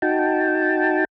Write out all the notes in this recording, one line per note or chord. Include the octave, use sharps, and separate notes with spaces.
D#4 F#4 G5 A5